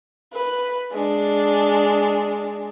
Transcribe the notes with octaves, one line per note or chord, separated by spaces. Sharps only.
B4
G#3 D4